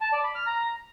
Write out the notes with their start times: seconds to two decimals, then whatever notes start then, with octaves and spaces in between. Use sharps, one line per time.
0.01 A5
0.12 D5
0.24 B5
0.35 F6
0.46 A#5